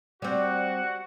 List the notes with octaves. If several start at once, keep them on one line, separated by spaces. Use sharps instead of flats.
G3 C4 F#4 F#5